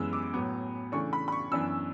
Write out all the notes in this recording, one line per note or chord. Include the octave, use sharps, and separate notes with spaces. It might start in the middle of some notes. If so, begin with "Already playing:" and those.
Already playing: F#2 E3 G#3 B3 E6
D6
A2 F#3 B3
C#3 E3 A3 D4 C#6
B5
B5
C#6
F#2 E3 B3 D4 E6